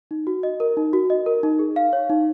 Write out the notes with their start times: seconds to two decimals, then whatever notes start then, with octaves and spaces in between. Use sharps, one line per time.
0.11 D#4
0.27 F#4
0.43 D#5
0.60 A#4
0.77 D#4
0.93 F#4
1.10 D#5
1.26 A#4
1.43 D#4
1.59 G#4
1.76 F5
1.93 C#5
2.10 D#4